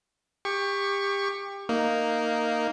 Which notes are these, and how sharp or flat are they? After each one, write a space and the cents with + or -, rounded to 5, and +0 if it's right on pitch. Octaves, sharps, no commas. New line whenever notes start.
G4 +25 C#6 +0
A#3 -5 D#4 +0